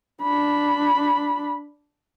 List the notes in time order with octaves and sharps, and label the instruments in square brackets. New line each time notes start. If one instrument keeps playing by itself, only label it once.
[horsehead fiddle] D4 B5